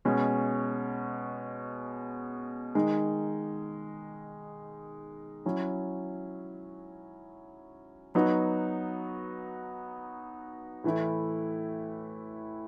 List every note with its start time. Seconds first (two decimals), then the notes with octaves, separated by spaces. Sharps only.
0.05 B2 G#3 C#4
2.75 D#3 G#3 D#4
5.45 F#3 C#4 E4
8.15 F#3 B3 D#4 F#4
10.84 A2 E3 A3 E4